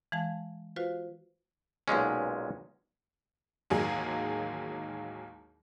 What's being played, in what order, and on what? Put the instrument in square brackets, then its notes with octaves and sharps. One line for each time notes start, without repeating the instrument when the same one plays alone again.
[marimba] E3 G#3 F5 A5
F4 F#4 B4 C5 F5
[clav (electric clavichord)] B1 A#2 G#3 C#4
[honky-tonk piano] A1 D#2 F#3 G#3 A#3 G#4